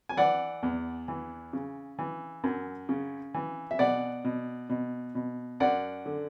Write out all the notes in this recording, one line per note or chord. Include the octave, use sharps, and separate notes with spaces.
G#5
E3 D5 F#5
E2
E3
C#3
E3
F#2
C#3
E3
E5
B2 D5 F#5
B2
B2
B2
F#2 D5 F#5
D3